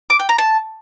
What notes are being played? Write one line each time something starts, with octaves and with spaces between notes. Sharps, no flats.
D6
G5
A#5
A5